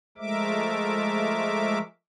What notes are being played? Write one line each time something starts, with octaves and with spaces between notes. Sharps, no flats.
F3 G#3 A3 A#4 E5 D6